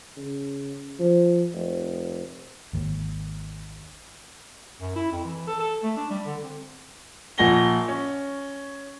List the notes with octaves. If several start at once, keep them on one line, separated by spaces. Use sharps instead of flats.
C#3
F3
F1
G#1 D#2
F#2
E4
F2
E3
A4
A4
A3
D4
G3
D3
C4
A#1 A#2 F#5 G#5 A#6 G7
C#4